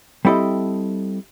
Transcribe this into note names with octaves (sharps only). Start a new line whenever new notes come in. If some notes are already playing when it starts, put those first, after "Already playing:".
G3 C4 E4 A4 D#5